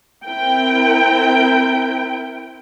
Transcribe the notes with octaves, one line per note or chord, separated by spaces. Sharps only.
C4 E4 A#4 G5